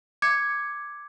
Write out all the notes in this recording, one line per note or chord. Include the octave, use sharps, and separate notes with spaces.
D6 G#6 C#7